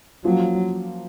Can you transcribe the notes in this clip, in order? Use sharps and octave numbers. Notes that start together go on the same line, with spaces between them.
F3 F#3 A#3 C#4 F4